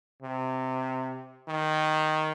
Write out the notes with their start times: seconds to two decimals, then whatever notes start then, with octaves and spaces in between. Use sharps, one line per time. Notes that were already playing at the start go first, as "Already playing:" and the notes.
0.22 C3
1.48 D#3